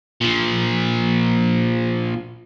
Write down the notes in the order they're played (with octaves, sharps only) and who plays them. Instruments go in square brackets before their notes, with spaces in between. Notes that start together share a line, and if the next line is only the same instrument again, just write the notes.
[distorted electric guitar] A#2 F3